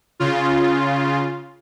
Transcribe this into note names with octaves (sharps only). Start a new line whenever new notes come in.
C#3 F4